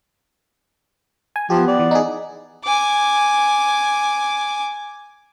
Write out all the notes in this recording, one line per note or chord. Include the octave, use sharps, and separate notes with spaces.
G#5
F3 B3 G4
D5
E3
D#4 G#4
G#5 D6